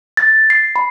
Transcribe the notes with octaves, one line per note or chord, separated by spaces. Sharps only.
A6
C7
B5